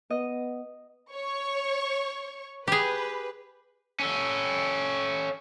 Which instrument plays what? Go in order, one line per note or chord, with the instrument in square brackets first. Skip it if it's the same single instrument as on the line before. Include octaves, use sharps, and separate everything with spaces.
[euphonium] B3 [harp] D#5
[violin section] C#5 C#6
[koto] G4 G#4 [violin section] B4
[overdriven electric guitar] C#4 A4